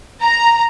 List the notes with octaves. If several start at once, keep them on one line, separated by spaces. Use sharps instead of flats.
A#5